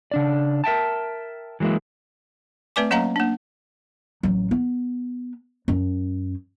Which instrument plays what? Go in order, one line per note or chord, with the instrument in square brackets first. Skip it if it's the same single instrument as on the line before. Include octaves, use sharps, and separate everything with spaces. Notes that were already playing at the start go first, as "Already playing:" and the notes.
[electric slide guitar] C#3 D4 D5
A#4 E5 G5 A5
E3 F#3 G#3 A#3 E4
[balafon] A3 C4 B4 D5 G#5 D6
F#3 A#3 C#4 D#5 F5 A#5
A#3 D4
[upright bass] A1 F#3
B3
F#2